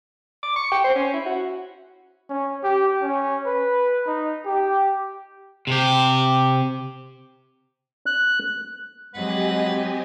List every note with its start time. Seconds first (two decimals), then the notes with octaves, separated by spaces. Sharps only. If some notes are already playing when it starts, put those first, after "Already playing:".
0.43 D6
0.56 C#6
0.71 G5
0.84 C5
0.96 C#4
1.14 E4
1.26 F#4
2.30 C#4
2.63 G4
3.02 C#4
3.46 B4
4.07 D#4
4.45 G4
5.67 C3 G4
8.06 F#6
9.14 F#3 G#3 C4 G4 B4 D#5 F#5 G#5